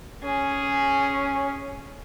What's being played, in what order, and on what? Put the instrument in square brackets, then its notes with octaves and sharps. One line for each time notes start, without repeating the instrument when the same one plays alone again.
[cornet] C#4 [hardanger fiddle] G#4